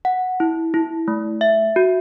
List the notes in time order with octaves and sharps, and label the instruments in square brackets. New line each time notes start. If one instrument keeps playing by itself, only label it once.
[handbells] F#5
E4
E4
A3
E5
F#4